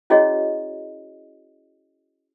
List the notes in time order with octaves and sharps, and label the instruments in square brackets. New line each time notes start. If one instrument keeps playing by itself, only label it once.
[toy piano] C#4 E4 F#4 G#4 C#5 D#5